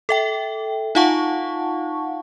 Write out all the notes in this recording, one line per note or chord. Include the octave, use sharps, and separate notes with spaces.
A4 E5 G5
D#4 F4 F5 F#5 A5 C#6